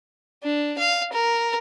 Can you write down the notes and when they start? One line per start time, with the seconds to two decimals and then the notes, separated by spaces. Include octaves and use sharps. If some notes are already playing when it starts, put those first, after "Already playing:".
0.43 D4
0.78 F5
1.13 A#4